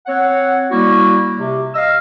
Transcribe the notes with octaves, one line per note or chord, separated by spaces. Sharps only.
C4 C#5 F#5
G3 A#3 E4 F#4
C3
D#5 F5 E6